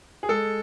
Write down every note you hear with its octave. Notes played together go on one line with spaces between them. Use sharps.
G#4
G#3 A4